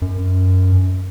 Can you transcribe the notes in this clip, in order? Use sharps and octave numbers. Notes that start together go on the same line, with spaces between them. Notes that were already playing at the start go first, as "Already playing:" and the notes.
F#2